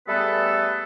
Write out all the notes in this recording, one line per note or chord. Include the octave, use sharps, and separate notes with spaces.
G3 A3 B3 G#4 A4 B4